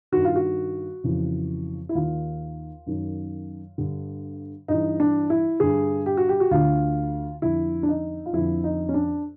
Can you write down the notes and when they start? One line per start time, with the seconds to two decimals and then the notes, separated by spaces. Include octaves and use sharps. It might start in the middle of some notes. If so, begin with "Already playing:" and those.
0.12 G2 D#3 F#4
0.25 F4
0.36 F#4
1.04 F2 C#3 E3
1.89 E4
1.95 D#2 D#3 F4
2.87 F#2 D#3
3.78 G2 D3
4.68 G2 E3 D#4
5.00 D4
5.30 E4
5.60 G2 D3 G#4
6.06 G4
6.17 F#4
6.29 G4
6.40 F#4
6.51 D2 D3 F4
7.42 F2 D3 E4
7.83 D4
7.89 D#4
8.26 F4
8.33 F2 D3 E4
8.64 D#4
8.89 C#4
8.94 D4